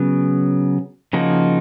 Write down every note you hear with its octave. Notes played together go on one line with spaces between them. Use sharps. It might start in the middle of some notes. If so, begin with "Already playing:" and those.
Already playing: C#3 F#3 B3
C#3 F3 A#3 D#4 F#4